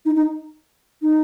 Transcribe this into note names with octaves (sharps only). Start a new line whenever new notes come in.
D#4
D#4
D#4